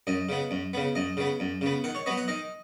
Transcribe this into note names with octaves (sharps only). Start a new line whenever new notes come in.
F#2 D#5
C#3 B3
F#2
C#3 B3
F#2 D#5
C#3 B3
F#2
C#3 B3
D#3 F#5
C#5
F#3 B3 D#5
F#5
D#3 D#5